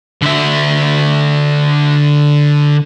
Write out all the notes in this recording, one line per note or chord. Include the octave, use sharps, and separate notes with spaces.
D3 E5